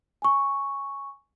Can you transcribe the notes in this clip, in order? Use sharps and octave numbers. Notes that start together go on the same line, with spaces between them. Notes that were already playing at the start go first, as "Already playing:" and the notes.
G#5 C#6